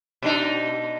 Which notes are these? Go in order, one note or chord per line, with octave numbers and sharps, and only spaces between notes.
B2 D4 D#4